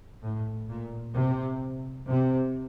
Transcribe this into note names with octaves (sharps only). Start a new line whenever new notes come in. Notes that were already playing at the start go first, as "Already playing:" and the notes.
A2
A#2
C3
C3